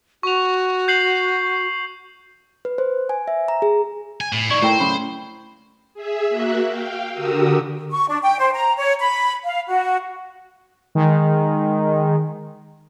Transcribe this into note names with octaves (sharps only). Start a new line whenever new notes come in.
F#4 C#6 F7
G6 C7 F#7
B4
C5
G#5
E5
A#5
G#4
G#5
A2
D#3 E4 D5 C#6 G#6
A2 E4 A4 A#4 C5 G5
F#2 A2 C#3 B5
G#4 E5
A#3 F#4 E5 F#5
F5 G5
D3 F#4 G4 A#4 D#6 E6
C#6
D4
G5
C5
A#5
C#5
B5
F5
F#4
D#3 G#3